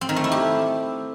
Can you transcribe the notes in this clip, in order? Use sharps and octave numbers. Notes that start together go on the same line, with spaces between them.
C4
D#3
A3
E4
G4